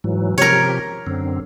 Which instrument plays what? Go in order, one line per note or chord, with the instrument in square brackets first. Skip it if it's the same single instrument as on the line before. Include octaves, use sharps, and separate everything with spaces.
[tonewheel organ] G#2 E3 F#3
[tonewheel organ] C3 F3 G4 [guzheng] A#4 C#5
[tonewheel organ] F#2 D3 C4